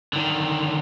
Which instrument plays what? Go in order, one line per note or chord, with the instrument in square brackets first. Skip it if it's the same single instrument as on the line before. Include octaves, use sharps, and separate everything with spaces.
[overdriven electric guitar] D3 D#3